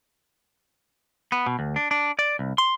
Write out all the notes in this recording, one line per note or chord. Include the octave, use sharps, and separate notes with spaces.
B3
B2
D2
D4
D4
D5
C2
C6